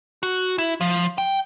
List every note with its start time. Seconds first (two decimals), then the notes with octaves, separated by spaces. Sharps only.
0.23 F#4
0.58 E4
0.81 F3
1.18 G5